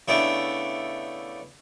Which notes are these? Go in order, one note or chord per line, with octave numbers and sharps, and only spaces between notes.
C#3 A3 B3 D4 E4 G5